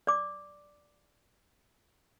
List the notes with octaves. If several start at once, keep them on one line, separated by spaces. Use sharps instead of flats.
D5 D6